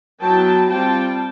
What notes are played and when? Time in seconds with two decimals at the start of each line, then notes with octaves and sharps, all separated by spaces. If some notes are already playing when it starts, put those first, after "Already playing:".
0.21 F#3 B3 E4 G5 A5
0.69 G3 C4 F4 G5 A5